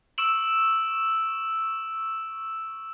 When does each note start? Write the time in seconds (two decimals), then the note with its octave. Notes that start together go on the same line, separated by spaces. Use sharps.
0.18 C#6 E6 D7 E7 F#7